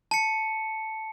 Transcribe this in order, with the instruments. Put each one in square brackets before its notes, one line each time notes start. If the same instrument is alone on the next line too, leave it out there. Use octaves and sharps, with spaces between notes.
[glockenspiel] A5 C#7